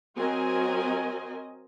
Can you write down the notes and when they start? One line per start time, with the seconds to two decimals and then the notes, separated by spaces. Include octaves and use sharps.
0.18 F#3 C4 F#4 A#4 D#5 G#5